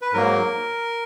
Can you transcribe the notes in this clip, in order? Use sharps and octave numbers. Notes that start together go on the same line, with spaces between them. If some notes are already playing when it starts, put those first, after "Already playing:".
B4
G#2 F#3 A#3 A#4